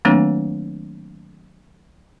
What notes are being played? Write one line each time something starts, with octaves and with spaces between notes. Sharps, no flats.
D#3 F#3 A3 A#3 C4 D4